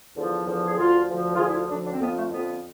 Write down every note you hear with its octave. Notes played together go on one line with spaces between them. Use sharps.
E2 D3 F3
E2 D3 F3
G#4
D2 D3 F3 F4
D2 D3 F3
F4
D2 D3 F3 G#4
E4
F4
D2 D3 F3 D4
D4
C4
F2 D3 F3 B3
A3
F2 D3 F3 B3